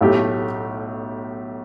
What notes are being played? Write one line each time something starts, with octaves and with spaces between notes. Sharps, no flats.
B1 A2 A3 G4